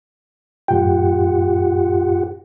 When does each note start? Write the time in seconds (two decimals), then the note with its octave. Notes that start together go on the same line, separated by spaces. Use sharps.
0.68 F#2 A2 F4 G4 F#5 G5